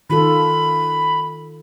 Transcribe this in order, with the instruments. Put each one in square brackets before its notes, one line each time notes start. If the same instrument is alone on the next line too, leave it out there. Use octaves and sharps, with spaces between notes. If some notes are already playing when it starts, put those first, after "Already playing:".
[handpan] D#3 F4 A4 [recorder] B5